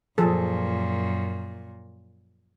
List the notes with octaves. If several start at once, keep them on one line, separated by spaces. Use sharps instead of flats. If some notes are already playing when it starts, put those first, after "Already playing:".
F#2 A#2 F3 G#4 A4